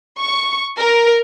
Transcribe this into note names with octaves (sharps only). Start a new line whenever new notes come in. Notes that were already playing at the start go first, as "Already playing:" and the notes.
C#6
A#4